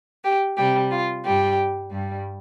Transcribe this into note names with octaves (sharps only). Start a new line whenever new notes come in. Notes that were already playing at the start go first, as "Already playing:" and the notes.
G4
C3 G3 G4
F4
G2 G3 G4
G2 G3